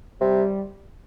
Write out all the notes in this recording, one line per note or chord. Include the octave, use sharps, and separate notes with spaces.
C3 G3